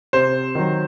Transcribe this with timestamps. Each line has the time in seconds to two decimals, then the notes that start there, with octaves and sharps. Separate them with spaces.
0.13 C3 C5
0.55 D#3 F#3